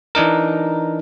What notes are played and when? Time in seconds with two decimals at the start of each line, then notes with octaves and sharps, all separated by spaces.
0.15 E3 D4 D#4 A#4